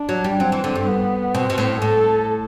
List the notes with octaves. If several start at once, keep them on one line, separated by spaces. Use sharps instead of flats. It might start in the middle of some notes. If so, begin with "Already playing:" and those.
Already playing: D4
F#3
G3
F#3 C4
E3
D3
G2
B3
B2 C4
B2
A2
A2 A4